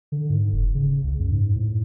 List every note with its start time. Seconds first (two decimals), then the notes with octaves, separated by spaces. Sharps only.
0.12 D3
0.30 G#2
0.53 F1
0.75 C#3
1.04 C#2
1.19 F#2
1.31 G#2
1.56 A2